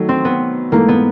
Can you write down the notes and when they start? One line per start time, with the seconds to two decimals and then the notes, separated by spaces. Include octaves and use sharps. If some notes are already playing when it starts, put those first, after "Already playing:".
Already playing: D#3 F#3 A3
0.09 C4
0.25 B3
0.72 G#2 E3 A3 A#3
0.88 B3